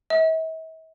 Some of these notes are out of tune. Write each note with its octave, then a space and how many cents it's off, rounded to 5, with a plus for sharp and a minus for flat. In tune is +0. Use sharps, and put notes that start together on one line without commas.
E5 -45